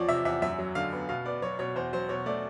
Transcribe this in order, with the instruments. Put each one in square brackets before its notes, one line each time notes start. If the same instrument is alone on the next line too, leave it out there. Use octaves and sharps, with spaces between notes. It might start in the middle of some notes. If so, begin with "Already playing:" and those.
Already playing: [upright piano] E2 F3 C#5 D5
C3 E5
E2 E5
F#2 E5
F#3
D3 F5
B3
B2 F5
B3 D5
F#3 C#5
B2 C#5
E2 C5
F#3 C5
B2 C#5
A3 D5